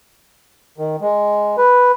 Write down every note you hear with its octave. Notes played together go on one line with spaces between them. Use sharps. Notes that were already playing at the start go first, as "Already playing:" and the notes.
D#3
G#3
B4